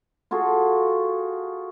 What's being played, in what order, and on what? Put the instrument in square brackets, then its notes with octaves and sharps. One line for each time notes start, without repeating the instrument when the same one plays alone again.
[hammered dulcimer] F4 F#4 G#4 A4